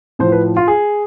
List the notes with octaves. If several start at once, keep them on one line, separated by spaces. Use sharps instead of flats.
A2 F3 C5
B4
F4
G#4